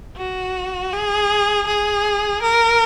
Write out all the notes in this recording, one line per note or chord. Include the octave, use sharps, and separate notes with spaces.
F#4
G#4
G#4
A#4